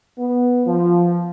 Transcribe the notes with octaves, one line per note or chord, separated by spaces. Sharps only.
B3
F3